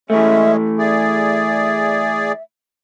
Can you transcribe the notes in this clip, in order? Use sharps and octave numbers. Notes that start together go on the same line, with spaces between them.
E3 G#3 A3 C#4 E5
G#4 D5 E5